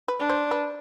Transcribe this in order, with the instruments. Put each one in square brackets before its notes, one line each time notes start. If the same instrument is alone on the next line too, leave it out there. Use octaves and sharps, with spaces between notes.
[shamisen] B4
[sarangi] D4
[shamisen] C5
B4